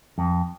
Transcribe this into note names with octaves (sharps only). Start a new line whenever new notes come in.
F2